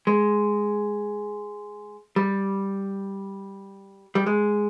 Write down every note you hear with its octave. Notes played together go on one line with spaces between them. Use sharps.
G#3
G3
G3
G#3